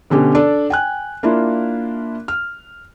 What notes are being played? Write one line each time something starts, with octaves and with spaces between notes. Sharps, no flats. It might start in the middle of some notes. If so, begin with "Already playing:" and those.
B2 D3 C#4 G4
D4 A4 D5
G5 G#5 F#6
A#3 D4 E4 F4
F6